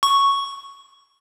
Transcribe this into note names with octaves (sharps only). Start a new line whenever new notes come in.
C#6